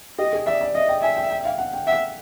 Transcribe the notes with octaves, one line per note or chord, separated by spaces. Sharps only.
G4 D#5
G#4
D5 E5
D5
D#5 E5
G5
E5 G#5
G5
G5
E5
F5
F#5
G5
E5 F#5